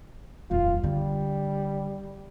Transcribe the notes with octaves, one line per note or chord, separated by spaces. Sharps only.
D#1 F2 F4
D3 G3